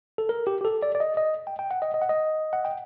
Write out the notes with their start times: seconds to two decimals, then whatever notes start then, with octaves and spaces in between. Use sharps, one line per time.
0.18 A4
0.29 A#4
0.47 G4
0.61 G4
0.65 A4
0.83 D5
0.95 D5
1.00 D#5
1.17 D#5
1.47 G5
1.59 G5
1.71 F#5
1.82 D#5
1.94 D#5
2.02 F#5
2.09 D#5
2.53 F#5
2.65 G5